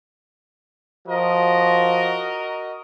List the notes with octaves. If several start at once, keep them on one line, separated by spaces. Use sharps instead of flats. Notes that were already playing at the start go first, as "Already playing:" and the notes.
F3 F#4 A#4 D#5